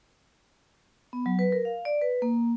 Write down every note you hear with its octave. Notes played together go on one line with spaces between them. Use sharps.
B3
F#3
B4
A#4
F5
D5
B4
A#3